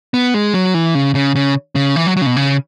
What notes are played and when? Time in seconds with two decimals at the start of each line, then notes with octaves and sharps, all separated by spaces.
0.14 B3
0.34 G#3
0.54 F#3
0.74 E3
0.95 C#3
1.15 C#3
1.35 C#3
1.76 C#3
1.96 E3
2.06 F#3
2.17 F#3
2.22 C#3
2.26 B2
2.36 C#3